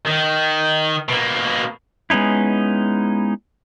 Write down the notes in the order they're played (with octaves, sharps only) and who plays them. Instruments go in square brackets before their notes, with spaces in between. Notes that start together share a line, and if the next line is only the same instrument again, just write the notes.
[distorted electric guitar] D#3
B2 A#3
[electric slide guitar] G#3 B3 C#4 D#4 E4